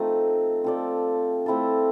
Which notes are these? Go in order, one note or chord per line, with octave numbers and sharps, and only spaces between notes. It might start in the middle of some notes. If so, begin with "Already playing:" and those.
Already playing: F3 A3 C4 D#4
C4 F4 A4 D5
A3 C4 E4 A4